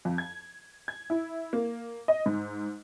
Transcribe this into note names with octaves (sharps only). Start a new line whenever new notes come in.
F2
G#6
G#6
E4
A#3
D#5
G#2